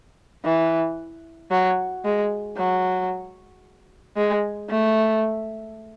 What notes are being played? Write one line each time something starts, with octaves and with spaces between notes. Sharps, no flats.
E3
F#3
G#3
F#3
G#3
A3